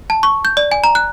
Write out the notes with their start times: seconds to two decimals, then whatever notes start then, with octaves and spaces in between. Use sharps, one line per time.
0.10 A5
0.23 C#6
0.45 G6
0.57 D5
0.71 G#5
0.84 A#5
0.95 F#6